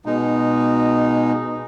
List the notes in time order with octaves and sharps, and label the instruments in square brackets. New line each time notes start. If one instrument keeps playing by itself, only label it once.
[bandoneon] B2 G#3 D#4